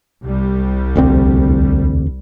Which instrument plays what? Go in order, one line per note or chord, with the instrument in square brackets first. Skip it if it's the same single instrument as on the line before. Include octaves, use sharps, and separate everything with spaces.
[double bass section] C2 G3
[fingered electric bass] E1 D2 C4